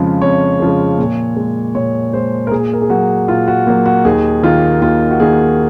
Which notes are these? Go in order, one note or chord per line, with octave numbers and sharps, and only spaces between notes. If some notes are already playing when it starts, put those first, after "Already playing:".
Already playing: F2 C#3 F3 G#3
F2 C#5
C#3 F3 G#3
A#2
G#3
A#2 C#5
G#3 C5
A#4
A#2 G#4
A#4
G#4
F#3 A#3 F#4
A#2 F4
F#4
F#3 A#3
F#4
D#2 G#4
D#3 A#3 F4
D#2 F4
F#4
D#3 A#3 G#4